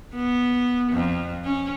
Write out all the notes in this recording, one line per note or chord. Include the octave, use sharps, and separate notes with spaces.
B3
F2
C#4